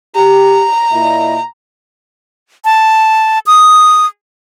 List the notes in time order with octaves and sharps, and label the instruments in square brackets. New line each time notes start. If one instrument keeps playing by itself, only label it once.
[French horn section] G4 [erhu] A#5
[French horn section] A#2 E4 D#5
[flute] A5
D#6